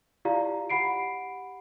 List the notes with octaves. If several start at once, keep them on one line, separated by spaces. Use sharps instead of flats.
E4 F4 G4 D5 F5 A#5
G4 F#5 B5 C7 D7